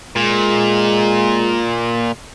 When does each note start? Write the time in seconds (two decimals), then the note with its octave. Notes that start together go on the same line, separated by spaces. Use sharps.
0.16 A#2 G#3